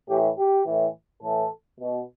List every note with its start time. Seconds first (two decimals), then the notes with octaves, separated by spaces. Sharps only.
0.09 A2 E3 G4
0.37 G4
0.66 A2 E3
1.23 A2 E3 A4
1.80 B2